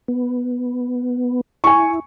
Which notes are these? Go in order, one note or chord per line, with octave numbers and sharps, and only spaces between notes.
B3
E4 G#5 C#6